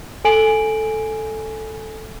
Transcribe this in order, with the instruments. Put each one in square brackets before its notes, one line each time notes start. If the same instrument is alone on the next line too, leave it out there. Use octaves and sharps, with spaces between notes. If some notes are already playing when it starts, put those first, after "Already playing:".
[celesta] A4 G#5 D7 F#7